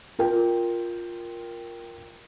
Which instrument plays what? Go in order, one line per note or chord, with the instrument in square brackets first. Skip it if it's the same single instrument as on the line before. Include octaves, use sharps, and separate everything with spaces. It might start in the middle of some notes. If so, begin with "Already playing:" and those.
[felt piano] F4 A#4 G5